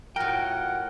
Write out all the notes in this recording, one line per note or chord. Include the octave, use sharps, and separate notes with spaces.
A2 F4 F#4 A#4 F#5 G5